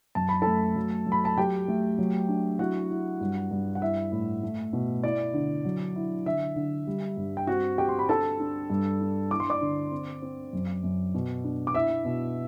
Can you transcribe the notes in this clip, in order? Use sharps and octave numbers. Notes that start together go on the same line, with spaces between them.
F#2 A5
B5
A3 A4 A5
F#3
F#3
B5
A5
F#3 G4 G5
A3
F#3
D4
E4 F#4 F#5
E4
G2
G2
F#5
E4 E5
A2
A3
B2
E4 D5
D3
F#3
E4
D3 E5
D3
G3
G2
G5
C4 F#4 F#5
C4 G4 G5
C6
B5
D4 A4 A5
D4
G2
D4
E4 D6
C6
D5 D6
D3
C4
C4
F#2
F#2
B2
D4
D6
E4 E5 E6
B2